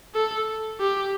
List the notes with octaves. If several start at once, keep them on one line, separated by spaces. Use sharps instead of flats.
A4
G4